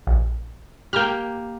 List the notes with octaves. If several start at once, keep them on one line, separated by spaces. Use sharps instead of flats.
A#1
A#3 G4 G5 A#5 F6